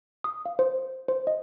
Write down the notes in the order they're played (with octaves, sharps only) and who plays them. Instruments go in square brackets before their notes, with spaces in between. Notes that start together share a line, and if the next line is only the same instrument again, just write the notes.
[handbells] D#6
F5
C5
C5
D#5